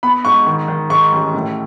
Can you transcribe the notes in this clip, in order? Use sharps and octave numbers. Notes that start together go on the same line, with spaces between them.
B3 B5
G#2 C#6
D#3
D#3
G#2 C#6
A1
A2